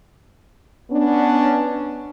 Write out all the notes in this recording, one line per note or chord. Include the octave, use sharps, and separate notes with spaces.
B3 C#4 D4